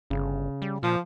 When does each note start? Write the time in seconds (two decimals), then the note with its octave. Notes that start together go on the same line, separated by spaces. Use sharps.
0.10 G1 C#3
0.62 G3
0.83 A#2 F3